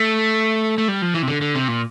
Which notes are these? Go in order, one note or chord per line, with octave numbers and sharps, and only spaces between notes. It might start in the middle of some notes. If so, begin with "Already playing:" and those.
Already playing: A3
A3
G3
F3
E3
C3
D3
D3
C3
A#2